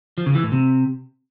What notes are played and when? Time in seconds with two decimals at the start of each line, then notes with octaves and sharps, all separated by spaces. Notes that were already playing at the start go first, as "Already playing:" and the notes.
0.18 F3
0.26 C#3
0.35 E3
0.43 A2
0.52 C3